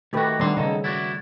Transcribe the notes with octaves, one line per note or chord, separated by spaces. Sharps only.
D#3 A3 F#4 G4 B4
D#3 G3 B3 D4 C6
C#3 D#4 A4
E4 F#4 D5